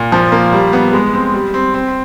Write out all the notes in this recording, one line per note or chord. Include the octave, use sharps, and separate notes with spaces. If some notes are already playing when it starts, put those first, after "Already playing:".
Already playing: A#2
F3
A#3
G3
B3
G#3
C4
G3
C4
C4